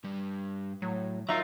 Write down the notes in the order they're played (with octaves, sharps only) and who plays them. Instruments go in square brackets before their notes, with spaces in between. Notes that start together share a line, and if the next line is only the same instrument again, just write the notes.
[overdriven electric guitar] G2 G3
[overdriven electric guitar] A2 [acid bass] F#3
[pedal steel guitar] F#3 D#4 F4 [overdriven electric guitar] A#4 A#5 [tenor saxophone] E5